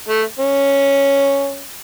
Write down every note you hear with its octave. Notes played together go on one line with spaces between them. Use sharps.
A3
C#4